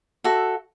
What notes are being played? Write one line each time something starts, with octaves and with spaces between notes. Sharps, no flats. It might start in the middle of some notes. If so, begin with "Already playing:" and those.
F#4 A4 E5